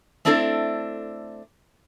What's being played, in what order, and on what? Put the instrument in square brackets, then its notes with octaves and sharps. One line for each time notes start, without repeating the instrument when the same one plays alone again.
[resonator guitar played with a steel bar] A3 C4 D4 E4 A4